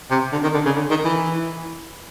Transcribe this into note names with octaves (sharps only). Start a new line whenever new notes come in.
C3
D3
D#3
D3
C#3
D3
D#3
E3